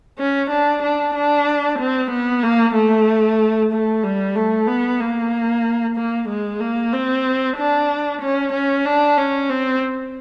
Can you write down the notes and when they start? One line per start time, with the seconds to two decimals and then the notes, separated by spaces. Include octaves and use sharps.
0.18 C#4
0.51 D4
0.83 D4
1.15 D4
1.79 C4
2.11 B3
2.43 A#3
2.76 A3
3.72 A3
4.04 G3
4.36 A3
4.68 B3
5.00 A#3
5.97 A#3
6.29 G#3
6.61 A#3
6.93 C4
7.57 D4
8.22 C#4
8.53 C#4
8.85 D4
9.17 C#4
9.50 C4